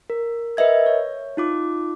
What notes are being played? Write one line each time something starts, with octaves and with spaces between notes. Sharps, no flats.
A#4
A#4 B4 D#5 E5 G#6
C#5
D#4 F4 D6